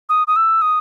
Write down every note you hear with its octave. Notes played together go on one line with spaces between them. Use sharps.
D#6
D#6
E6
D#6